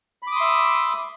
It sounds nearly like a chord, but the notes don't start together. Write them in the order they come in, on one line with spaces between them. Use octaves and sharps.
B5 D6 D#6 C6 E5